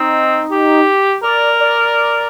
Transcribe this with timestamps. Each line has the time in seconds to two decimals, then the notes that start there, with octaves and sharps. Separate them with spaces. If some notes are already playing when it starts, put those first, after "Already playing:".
Already playing: C4 D#4
0.51 G4
1.23 A#4 D5
1.60 D5